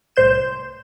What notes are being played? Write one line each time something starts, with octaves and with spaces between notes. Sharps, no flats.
C2 A2 C5 G6 E7